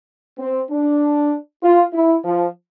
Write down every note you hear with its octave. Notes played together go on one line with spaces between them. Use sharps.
C4
D4
F4
E4
F3